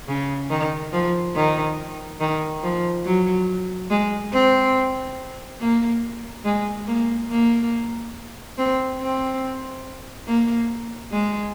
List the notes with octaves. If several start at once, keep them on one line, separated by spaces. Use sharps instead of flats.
C#3
D#3
F3
D#3
D#3
F3
F#3
G#3
C4
A#3
G#3
A#3
A#3
C4
C4
A#3
G#3